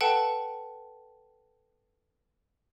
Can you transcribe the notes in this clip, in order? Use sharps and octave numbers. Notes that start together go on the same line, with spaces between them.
A4 B4 F#5 G5 A5